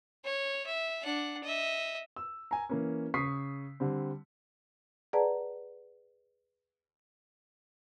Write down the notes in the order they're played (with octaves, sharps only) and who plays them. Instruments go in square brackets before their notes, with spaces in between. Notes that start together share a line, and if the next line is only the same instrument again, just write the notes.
[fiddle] C#5
E5
D4 F#5
D#5 E5
[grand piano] E6
G#5 A#5
E3 A#3 C#4
C#3 C#6 D#6 B6 C7
D3 G3 C4
[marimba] G#4 B4 D5 F#5 A5 A#5